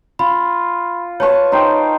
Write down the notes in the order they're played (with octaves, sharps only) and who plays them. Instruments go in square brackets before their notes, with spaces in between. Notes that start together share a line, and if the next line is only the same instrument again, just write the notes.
[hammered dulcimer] F4 [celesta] B5
[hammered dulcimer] B4 A5 C#6 [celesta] C#5
[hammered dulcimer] D#4 C5 G5